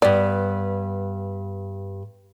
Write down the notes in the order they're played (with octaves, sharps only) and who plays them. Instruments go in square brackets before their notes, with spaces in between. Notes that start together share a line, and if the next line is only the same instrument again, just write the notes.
[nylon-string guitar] G2 B3 [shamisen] D5